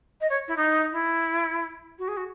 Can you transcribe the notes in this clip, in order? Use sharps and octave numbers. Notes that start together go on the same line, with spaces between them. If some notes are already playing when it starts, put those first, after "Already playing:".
D#5
C#5
E4
D#4
E4
F#4
G#4
F#4